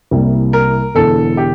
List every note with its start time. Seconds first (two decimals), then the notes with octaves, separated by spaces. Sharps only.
0.11 C2 C3 G3 A#3 E4
0.53 A#4
0.95 E1 E2 D3 A4
1.37 G4